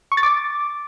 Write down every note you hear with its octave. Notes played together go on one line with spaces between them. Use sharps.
C#6
A6
D6